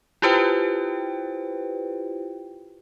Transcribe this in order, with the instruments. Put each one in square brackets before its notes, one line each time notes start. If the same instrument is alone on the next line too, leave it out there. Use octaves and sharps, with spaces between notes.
[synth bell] E4 F4 G4 B4 C5 G5